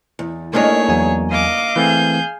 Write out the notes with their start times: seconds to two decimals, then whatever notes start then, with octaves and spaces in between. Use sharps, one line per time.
0.19 E2
0.53 A3 A#3 D4 D#4 G#4 C#5
0.89 E2 F#3 G#5
1.31 D#5 F5 D6
1.76 E3 A3 C4 G#4 G6